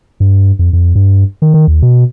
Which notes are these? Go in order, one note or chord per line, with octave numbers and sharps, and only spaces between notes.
G2
F2
F2
G2
D#3
D#3
D#2
B2